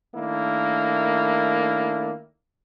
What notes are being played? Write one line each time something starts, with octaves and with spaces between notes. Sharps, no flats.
D#3 A3 A#3 D4 E4